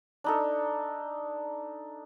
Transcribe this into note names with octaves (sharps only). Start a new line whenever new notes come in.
D4 D#4 A4